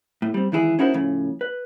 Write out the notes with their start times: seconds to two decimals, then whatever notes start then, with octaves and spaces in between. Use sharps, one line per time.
0.22 A2
0.34 G3 C4
0.52 C#2 D#3 E3 E4 G#4
0.79 C#4 D#4 E4 F#4 A#4 C5
0.93 A2 C#3 F3
1.41 B4